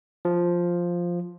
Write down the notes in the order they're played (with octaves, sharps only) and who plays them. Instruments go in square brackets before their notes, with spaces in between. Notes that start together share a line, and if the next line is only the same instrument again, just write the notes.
[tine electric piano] F3